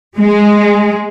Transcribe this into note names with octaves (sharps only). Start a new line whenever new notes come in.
G#3